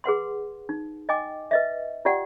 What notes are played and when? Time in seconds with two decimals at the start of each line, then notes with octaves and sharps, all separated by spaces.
0.04 G#4 B4 F#5 C6
0.69 D#4
1.09 D#5 G5 G#5 D6
1.51 B4 D#5 E5
2.05 F4 G4 D5 F#5 G5